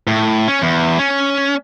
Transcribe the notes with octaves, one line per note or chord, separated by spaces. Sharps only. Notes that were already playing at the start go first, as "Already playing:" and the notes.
A2
C#4
E2
C#4